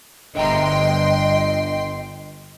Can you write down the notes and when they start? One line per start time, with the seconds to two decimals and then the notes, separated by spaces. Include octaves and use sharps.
0.35 G1 D3 D#5 E5 G5 A#5 C6